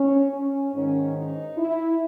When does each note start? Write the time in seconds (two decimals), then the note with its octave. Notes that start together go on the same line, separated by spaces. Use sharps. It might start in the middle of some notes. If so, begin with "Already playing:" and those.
Already playing: C#4
0.32 C#4
0.73 G#2 D#3 C#4
1.15 D#4
1.57 E4